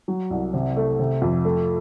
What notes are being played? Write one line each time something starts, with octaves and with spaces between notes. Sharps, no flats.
F#3
C2
C3
A3
C3
F2
A3